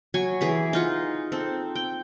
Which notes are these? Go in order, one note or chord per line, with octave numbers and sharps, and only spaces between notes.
F#3 G#5 C#6
E3 G#4 B5
D#4 F4 F#5
C4 A4
G5